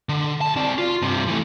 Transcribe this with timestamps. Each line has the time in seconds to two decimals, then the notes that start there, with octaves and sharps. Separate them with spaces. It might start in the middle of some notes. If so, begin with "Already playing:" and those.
0.09 D3
0.41 B1 A5
0.56 C4 D5
0.78 F4
1.02 G2 C3
1.28 E3 A3